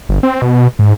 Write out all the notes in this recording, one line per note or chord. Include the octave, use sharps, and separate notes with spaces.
G1
C4
B2
G#2